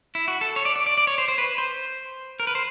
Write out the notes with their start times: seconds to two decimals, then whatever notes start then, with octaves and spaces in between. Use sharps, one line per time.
0.15 E4
0.28 F#4
0.41 A4
0.56 C#5
0.65 D5
0.76 D5
0.86 D5
0.97 D5
1.07 C#5
1.18 C5
1.28 C5
1.38 B4
1.58 C5
2.40 A#4
2.47 B4
2.55 C5